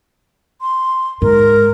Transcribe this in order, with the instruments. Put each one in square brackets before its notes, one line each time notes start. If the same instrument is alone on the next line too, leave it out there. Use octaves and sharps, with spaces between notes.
[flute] C6
[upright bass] G#2 [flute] A#4